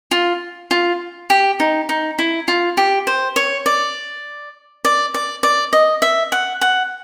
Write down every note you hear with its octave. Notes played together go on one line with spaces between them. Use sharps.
F4
F4
G4
D#4
D#4
E4
F4
G4
C5
C#5
D5
D5
D5
D5
D#5
E5
F#5
F#5